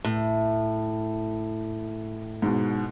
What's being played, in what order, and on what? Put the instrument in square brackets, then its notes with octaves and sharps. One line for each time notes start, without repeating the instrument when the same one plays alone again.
[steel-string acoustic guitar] A2
[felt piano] G#2 B2